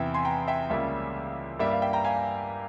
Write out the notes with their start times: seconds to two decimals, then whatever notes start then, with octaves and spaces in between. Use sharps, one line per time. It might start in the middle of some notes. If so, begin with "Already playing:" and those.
Already playing: E2 C3 E3 E5 G5
0.14 G#5 C6
0.25 G5 A#5
0.48 E5 G5
0.70 C#2 C#3 G3 A#3 E5
1.59 G2 G3 A#3 E5
1.71 F5
1.82 E5 G5
1.93 G5 A#5
2.04 F5 G#5